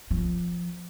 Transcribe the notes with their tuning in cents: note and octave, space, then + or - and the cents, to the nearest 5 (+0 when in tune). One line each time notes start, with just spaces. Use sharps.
F3 -5